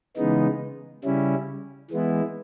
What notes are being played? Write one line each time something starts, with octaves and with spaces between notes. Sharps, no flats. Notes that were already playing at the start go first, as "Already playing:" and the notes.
C#3 E3 G#3 B3 D#4
C#3 G3 C#4 E4
E3 G#3 B3 E4